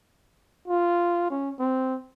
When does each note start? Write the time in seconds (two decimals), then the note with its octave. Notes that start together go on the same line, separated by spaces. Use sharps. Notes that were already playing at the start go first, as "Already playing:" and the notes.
0.68 F4
1.30 C#4
1.59 C4